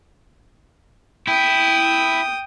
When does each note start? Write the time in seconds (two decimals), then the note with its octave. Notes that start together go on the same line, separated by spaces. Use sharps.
1.27 E4 G5 D#6